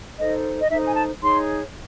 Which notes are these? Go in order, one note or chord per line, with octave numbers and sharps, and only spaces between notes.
D#4 A4 C5 D#5
D#5
D#4 A4 C5 E5
G#5
A5
D#4 G#4 C#5 C6